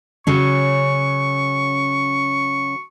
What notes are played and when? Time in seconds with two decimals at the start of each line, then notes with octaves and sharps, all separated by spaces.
0.27 C#3 F#3 C#4 C#6